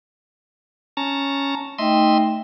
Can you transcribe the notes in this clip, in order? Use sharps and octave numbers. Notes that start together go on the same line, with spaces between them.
C#4 A5 A#5
A3 D#4 D#5 E5 G5 C6